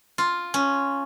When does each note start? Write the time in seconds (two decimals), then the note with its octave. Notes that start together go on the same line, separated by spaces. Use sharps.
0.18 F4
0.54 C#4